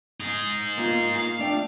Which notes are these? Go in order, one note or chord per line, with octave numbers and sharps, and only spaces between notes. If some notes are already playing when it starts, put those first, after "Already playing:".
D#4 G#4
A#3 F4
F5
A3 D4 G5